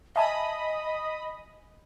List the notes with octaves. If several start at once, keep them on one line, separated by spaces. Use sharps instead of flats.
D#5 E5 G#5 A5 B5 D#6